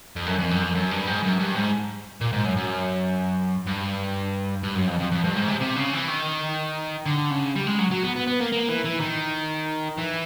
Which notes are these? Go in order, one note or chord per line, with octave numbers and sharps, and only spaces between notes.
F2
F#2
F2
F#2
F2
F#2
G2
G#2
F#2
G2
G#2
A#2
G#2
F#2
F#2
G2
G2
F#2
F2
F2
F2
G2
G#2
C3
C3
C#3
E3
D#3
D3
C#3
G3
G#3
F#3
F#3
B3
B3
B3
A#3
A#3
E3
E3
D#3
E3